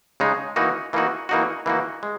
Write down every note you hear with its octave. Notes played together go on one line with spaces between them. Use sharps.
C#3 G#3 D#4
E3 A#3 D#4 F#4
E3 A#3 D#4 F#4
E3 A#3 D#4 F#4
E3 A#3 D#4 F#4
G#3